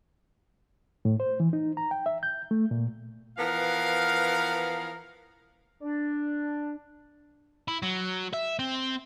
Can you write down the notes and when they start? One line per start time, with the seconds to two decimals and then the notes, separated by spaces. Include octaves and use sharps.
1.05 A2
1.20 C5
1.40 E3
1.53 D#4
1.77 A#5
1.91 G5
2.06 E5
2.23 G6
2.51 A3
2.71 A#2
3.38 E3 F3 B3 A#4 F5
5.80 D4
7.68 E4
7.83 F#3
8.33 E5
8.59 C4